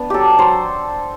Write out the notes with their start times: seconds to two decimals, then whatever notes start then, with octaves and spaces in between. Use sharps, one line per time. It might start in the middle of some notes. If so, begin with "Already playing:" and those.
Already playing: B3 D4
0.10 F#3 G4 A4
0.39 F#3 C5